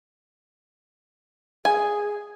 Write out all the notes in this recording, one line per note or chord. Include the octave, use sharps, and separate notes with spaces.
G#4 G#5